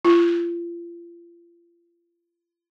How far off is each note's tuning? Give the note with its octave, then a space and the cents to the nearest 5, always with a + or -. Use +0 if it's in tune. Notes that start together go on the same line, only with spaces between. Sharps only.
F4 -35